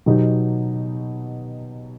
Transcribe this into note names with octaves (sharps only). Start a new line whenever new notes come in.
B2 F#3 B3 D#4 G4